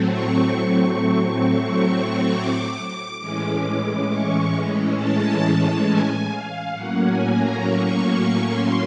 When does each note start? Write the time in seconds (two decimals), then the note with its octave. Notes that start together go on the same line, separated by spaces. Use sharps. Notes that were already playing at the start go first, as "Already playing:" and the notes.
Already playing: A2 F#3 A3 C4
0.08 C#6
2.30 D6
3.19 A2 E3 G#3 C#4
4.07 C#6
4.95 A5
5.84 G#5
6.29 F5
6.73 A2 F#3 A#3 C#4 F#5
7.03 G#5
7.33 A#5
7.63 C#6
8.06 C#6
8.51 C6